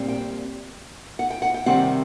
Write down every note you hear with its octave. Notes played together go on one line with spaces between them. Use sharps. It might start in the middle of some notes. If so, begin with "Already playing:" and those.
Already playing: A#2 G3 C4
G5
F#5
G5
F#5
G5
C3 D#3 G3 C4 F#5